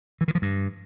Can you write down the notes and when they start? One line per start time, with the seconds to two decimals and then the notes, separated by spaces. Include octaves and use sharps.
0.21 E3
0.28 D#3
0.35 F3
0.42 G2